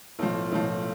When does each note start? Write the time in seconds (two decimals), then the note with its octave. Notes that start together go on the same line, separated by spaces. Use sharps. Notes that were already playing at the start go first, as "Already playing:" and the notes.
0.19 B1 A2 F3
0.52 B1 A2 F3